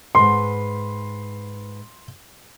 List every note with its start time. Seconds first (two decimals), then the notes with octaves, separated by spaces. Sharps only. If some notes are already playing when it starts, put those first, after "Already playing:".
0.15 G#2 B4 C6